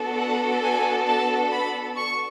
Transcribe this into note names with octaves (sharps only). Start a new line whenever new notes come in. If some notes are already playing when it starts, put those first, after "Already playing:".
Already playing: B3 D4 F#4 A4
F#5
G#5
A5
B5
C#6